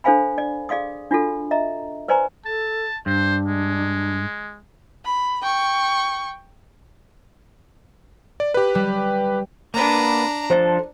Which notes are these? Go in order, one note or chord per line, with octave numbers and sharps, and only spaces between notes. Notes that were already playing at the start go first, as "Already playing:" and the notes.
D4 A4 C5 F5 G#5 B5
D5
G#4 D5 F5 C6 D#6
D4 F4 F#4 A4
D#5 E5 A#5
B4 C5 D5 G#5 A#5 C6
A4 A5
G2 D4 C5
G#3
B5
G5 C#6
D5
G4 B4
G3
A#3 B3 D4 B4 A#5
F3 D4 A4 C5